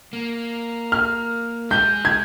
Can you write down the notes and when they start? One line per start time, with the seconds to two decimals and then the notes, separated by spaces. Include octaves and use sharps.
0.13 A#3
0.92 F6
1.71 G#3 G6
2.05 G#6